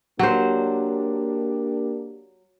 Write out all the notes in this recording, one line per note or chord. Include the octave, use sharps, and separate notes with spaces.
F#3 A#3 D4 G4 C5